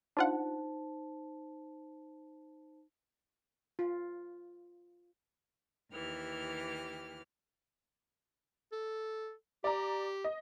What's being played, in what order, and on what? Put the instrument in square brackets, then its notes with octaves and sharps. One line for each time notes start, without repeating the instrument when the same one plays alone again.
[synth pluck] D4 F4 F#5 [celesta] D#4 C5 A5
[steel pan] F4
[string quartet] D#2 E3 G4 F6
[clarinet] A4
[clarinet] G4 [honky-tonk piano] D5 A#5
[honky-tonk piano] D#5